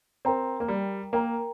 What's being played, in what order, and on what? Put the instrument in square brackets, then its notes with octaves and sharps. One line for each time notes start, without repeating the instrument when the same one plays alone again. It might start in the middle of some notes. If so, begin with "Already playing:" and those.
[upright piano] C4 [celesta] A#4 G5 A#5
[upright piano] A#3
G3
[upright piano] A#3 [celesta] A#4 G5 A#5